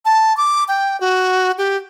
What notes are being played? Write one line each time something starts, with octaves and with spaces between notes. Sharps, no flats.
A5
D6
G5
F#4
G4